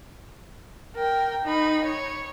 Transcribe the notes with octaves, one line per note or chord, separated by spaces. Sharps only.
A#4 G5
D#4 B5
C#5